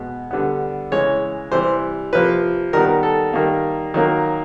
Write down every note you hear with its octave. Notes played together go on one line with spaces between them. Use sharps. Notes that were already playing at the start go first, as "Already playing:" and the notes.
Already playing: B2 G#3 B3
D3 G3 B3
C#3 E3 G#3 C#5
C3 E3 G3 C5
C3 F3 A#3 B4
D#3 G3 B3 A#4
A4
D#3 G3 A#3
D#3 F#3 A#3